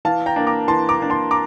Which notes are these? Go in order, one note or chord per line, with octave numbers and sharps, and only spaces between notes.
E3 F5 A5
G5 A#5
A#3 D4
A#5 D6
E3 A5 C6
A#5 D6
A#3 D4
A5 C6
A#5 D6